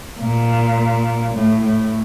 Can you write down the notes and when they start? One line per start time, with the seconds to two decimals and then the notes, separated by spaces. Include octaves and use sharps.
0.20 A#2
1.34 A2
1.63 A2